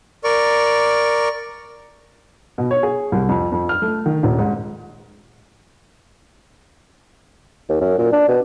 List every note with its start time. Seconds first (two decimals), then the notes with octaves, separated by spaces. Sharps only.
0.24 A#4 D5 C#6
2.58 B2
2.71 C#5
2.83 G#4
3.12 C2
3.29 F2
3.52 F2
3.69 F6
3.82 A3
4.06 D#3
4.23 D#1
4.39 G#2
7.70 D#2
7.81 F#2
7.99 A#2
8.12 D4
8.29 B2